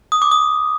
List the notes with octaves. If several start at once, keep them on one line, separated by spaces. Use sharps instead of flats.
D#6
D6
D#6